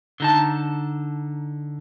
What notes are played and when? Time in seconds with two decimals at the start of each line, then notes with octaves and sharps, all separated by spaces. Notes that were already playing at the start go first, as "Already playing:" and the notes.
0.20 D3 D#4 A5